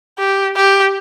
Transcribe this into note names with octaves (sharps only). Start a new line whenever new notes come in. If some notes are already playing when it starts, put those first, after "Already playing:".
G4
G4